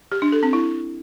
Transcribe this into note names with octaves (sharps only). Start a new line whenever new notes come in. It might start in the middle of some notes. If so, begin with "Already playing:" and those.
G4
D4
A4
C4
E4